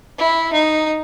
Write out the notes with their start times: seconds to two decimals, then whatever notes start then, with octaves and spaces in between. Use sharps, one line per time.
0.19 E4
0.53 D#4